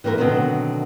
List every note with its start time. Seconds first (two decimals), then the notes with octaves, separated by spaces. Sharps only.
0.04 E3 A#3 E4 A#4
0.18 B2 D3 D#3 F#3 C4